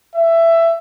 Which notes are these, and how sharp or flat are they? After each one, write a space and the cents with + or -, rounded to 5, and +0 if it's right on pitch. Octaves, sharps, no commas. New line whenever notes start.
E5 +15